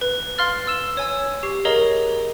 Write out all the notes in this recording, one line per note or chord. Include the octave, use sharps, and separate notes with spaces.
B4
F5 C6 F6 A6
E6 E7
C#5 G#5 E6
G4 C#6 C7
G#4 A#4 C#5 D#5 F5 A#5